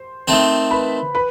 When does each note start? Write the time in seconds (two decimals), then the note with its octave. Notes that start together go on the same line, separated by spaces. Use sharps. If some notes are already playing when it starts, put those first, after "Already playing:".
Already playing: C5 C6
0.28 D#3 A3 C4
0.71 B4 B5
1.15 B4 B5